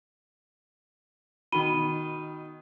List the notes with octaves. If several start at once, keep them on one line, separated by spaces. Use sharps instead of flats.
B2 D#3 B5 D#7 G7